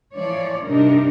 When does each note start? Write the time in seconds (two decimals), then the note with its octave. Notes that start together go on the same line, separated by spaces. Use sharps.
0.16 E3 F3 C#5 D5
0.67 G2 C3 D4 D#4 A#4